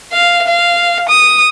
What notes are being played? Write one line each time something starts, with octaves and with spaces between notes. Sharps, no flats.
F5
F5
D#6